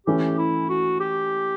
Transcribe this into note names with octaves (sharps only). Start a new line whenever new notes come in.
E3 A3 C#4 G4
E4
F#4
G4